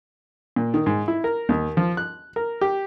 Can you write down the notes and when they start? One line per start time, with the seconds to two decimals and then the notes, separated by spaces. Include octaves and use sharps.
0.56 A#2
0.74 D#3
0.86 G#2
1.08 E4
1.24 A#4
1.49 D#2
1.77 F3
1.97 F#6
2.36 A#4
2.61 G4